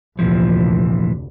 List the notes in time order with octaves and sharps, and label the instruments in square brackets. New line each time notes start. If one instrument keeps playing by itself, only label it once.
[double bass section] F1 D2 [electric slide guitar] A#2 E3 F3